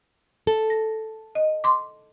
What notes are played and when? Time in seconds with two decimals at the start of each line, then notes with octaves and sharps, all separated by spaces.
0.47 A4
0.70 A#6
1.35 D#5
1.64 C6 D6